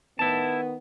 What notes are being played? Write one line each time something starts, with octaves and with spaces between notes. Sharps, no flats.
D#3 B3 E4 A5